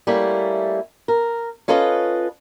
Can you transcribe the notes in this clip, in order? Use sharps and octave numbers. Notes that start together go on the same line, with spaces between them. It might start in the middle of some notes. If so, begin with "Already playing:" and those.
G3 A3 A#3 C#4 E4
A#4
C#4 F4 A4 B4 D#5